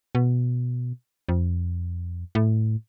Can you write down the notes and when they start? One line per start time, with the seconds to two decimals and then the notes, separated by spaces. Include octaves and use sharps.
0.15 B2
1.29 F2
2.35 A2